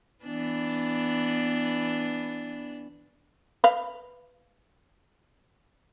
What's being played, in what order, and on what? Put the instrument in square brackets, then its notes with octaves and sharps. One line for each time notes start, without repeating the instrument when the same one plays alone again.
[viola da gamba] E3 B3 D4
[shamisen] B4 F5